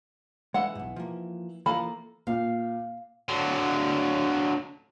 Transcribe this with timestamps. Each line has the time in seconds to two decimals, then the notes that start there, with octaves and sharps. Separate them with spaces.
0.54 E3 G#3 F#5
0.75 B1 G#2
0.96 F3 A#3
1.66 E3 F3 A#3 A4 B5
2.27 A#2 F5
3.28 D3 F#3